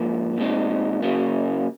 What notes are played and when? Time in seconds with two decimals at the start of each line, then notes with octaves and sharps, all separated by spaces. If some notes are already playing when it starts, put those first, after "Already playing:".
Already playing: G#2 F3 A#3
0.38 A#2 G#3 C4 D#4
1.02 C#3 F#3 A#3